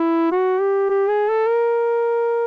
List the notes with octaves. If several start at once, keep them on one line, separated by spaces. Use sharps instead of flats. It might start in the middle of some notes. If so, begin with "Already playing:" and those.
Already playing: E4
F#4
G4
G4
G#4
A4
A#4